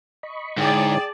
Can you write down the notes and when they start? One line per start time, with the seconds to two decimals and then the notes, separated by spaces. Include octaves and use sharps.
0.23 D#5 B5 C#6
0.58 G#2 D3 E4 G#4 C#5 D5 G5 A5